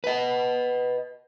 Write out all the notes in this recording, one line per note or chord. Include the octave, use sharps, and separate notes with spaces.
B4 D#5